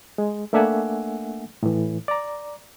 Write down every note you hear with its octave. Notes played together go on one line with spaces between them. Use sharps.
G#3
A3 A#3 D4 E5 F#5 G#5
A2 E3
D5 A#5